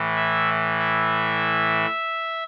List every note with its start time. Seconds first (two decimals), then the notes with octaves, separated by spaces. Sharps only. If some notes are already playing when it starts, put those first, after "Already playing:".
Already playing: A2 E3
0.16 E5
0.79 E5